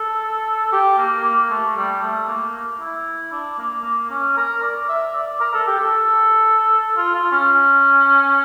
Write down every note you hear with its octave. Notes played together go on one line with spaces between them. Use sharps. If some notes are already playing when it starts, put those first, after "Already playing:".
Already playing: A4
G4
A#3
A#3
A3
G3
A3
A#3
E4
D4
A#3
A#3
C#4
A#4
D5
E5
D5
A#4
A4
G4
A4
F4
F4
C#4